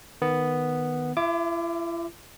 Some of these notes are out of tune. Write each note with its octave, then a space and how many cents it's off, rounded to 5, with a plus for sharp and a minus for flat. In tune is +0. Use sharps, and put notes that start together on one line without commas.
D#3 -10 B3 +0
E4 +45 E5 +0 D6 +5